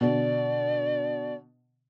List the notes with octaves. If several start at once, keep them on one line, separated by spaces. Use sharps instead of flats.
B2 D3 D5